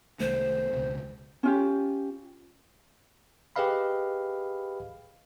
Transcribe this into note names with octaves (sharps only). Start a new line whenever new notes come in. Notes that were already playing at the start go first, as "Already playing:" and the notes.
C2 D#3 A3 C5
E1 C#2
C#4 F4 G4
G4 G#4 B4 D#5 F5 B5